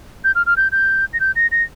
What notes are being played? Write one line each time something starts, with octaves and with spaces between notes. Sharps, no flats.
G6
F6
F6
G6
G6
A#6
G6
A#6
A#6